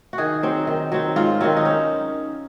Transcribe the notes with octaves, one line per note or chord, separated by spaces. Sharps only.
F#4
D#3 G#4
F#3 C4
D#3
F#3 C4
G#2 F4
D#3 F#3 C4
D#4
C#4